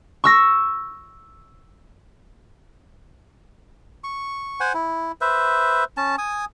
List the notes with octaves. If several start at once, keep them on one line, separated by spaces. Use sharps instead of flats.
C#6 E6 A#6
C#6
C5 F#5 G#5
E4
B4 C5 E5
C#4 A5
G#5 D#6